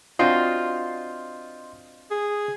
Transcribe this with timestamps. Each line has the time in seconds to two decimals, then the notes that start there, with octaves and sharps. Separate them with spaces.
0.19 C4 D4 F4 F#4 D#5 C6 G6
2.11 G#4